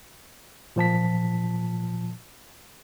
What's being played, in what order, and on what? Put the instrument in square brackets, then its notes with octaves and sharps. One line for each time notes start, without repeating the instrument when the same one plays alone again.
[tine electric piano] A#2 F3 A5 B6